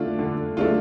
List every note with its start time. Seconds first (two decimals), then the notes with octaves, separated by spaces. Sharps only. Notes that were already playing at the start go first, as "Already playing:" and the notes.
Already playing: D3 A3 D4 F4
0.19 D3
0.57 A3 D4 F4